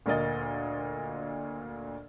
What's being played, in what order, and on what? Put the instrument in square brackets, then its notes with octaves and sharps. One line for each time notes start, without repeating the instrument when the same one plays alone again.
[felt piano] D2 A#2 A#4 D#5 A6